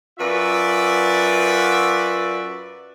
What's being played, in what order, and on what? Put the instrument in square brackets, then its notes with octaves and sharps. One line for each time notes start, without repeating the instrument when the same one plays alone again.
[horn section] F#2 F4 F#4 B4 D5 E5